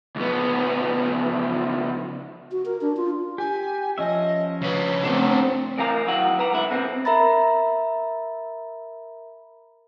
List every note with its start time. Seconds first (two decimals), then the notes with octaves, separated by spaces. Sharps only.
0.16 C#2 B3
2.52 F#4
2.66 A#4
2.81 D4
2.97 F4
3.38 G4 G#5
3.98 F3 C#4 D#5 E5
4.61 C#3 B4 C#5
5.03 A3 B3 C4 D4
5.78 A2 E3 A#4 F5 A#5
6.07 D#3 F#3 E4 F#5
6.39 B4 F#5 A#5
6.52 G#2 D3 E4
6.70 B2 D3 B3 C4
7.05 A#4 E5 A#5 B5 A6